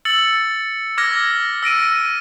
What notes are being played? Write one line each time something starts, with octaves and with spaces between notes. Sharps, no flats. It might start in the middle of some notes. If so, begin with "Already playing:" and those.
E6 A6 C#7 F#7
D6 F6 G#6 A#6
E6 A#6 D7 D#7